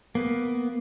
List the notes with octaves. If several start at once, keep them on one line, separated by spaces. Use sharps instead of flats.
A#3 B3